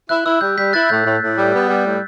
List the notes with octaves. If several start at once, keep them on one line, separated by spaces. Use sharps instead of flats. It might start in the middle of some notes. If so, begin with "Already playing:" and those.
E4 F#6
E4 E6
G3 G6
G3 G6 B6
E4 F#6 A6
A2 G6
A2
A2
G3
B3
G3
A2